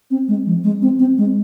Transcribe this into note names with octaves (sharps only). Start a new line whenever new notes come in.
C4
G#3
F3
G#3
C4
C4
G#3